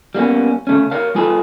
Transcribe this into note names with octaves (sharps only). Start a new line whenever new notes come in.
G3 A#3 B3 C#4
C#3 A3 C#4
A#4 C#5 F5
G3 F4 G#4 A4 B4